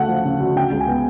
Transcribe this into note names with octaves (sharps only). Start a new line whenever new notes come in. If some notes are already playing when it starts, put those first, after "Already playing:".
Already playing: D2 C#3 A3 F#5
F3
C#3
D2
C#3 G5
C#2
G#5
B3